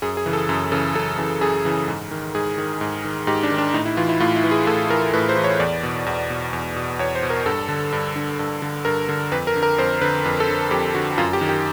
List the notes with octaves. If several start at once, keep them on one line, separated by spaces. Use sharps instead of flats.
F#2 G#4
G#4
C#3 E3
A4
F#2
C#3 E3 A4
F#2 A4
C#3 E3
F#2 G#4
C#3 E3
G#2
D#3
G#2 G#4
D#3
G#2
D#3
G#2 G4
D4
D#3
D4
A2 D#4
E4
E3 F4
E4
A2 F4
E4
E3
G#4
A2 A4
E3 A#4
A2 B4
C5
E3
C#5
E2 D5
B2
E2
B2
E2
B2
E2 C#5
C5
B2
A#4
G2 A4
D3
G2
D3
G2
D3
G2 A#4
D3
F2 B4
A#4
D3
A#4
F2 C5
D3 B4
F2 B4
A4
D3
F2 G4
D3 F#4
F#2 F4
G4
D#3
G4